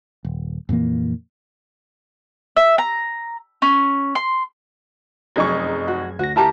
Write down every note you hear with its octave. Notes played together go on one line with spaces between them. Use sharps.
D#1
F2 A#2 E3 A#3
E5
A#5
C#4
C6
F1 F#2 D#4 G#4 C#6 G#6
F#4
D2 F#4 A#6
E4 G4 A#4 A5 A#5